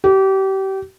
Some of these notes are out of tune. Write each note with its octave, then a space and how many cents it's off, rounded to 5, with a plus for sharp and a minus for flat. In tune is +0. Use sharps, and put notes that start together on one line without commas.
G4 -30